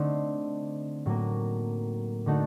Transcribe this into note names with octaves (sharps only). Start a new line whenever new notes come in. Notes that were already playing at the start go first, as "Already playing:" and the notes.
Already playing: D3 A3 C4 D#4
A2 F#3 A#3
D3 A3 D#4 F#4 A4